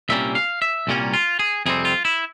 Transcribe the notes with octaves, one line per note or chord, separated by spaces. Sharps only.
C2 A#2 G3 A#3 C#4 E5
F5
E5
C2 A#2 G3 A#3 C#4
F4
G#4
F2 C3 G3 C4 G#4
F4
E4